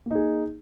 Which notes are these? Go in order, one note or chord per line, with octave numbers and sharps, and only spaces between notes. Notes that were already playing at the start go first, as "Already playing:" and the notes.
A#3 D#4 G#4